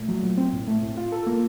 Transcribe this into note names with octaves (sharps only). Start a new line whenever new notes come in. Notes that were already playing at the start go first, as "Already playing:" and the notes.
Already playing: A#2 A3
F#3
A#2
C4
A2
A3
A2
F4
A4
A#3